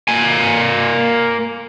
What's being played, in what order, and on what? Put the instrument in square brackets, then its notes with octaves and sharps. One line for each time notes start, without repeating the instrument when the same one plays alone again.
[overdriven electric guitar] A#3 G#5